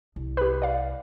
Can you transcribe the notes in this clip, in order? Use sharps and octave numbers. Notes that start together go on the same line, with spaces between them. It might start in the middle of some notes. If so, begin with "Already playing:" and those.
C2
G4 B4
D5 F5